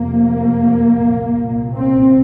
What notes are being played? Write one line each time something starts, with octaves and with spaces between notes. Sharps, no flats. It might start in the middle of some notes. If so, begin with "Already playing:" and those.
Already playing: F2 C3 A#3
C2 A#2
C4